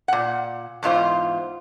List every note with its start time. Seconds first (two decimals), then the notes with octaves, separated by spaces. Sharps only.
0.08 A#2 F#5
0.83 E2 G#2 F4 C5